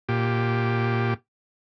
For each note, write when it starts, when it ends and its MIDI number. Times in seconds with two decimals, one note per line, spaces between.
0.09 1.14 46
0.09 1.14 67